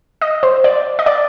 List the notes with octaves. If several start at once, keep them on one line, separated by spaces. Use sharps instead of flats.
D#5
C5
D5
D#5
D5